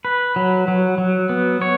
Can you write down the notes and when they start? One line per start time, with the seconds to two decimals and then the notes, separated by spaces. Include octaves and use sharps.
0.05 B4
0.36 F#3
0.68 F#3
0.98 F#3
1.29 B3
1.62 C#5